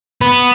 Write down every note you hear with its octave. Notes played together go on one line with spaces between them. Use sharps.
B3